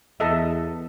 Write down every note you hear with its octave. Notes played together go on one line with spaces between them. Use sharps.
E2 A4 D#5 E5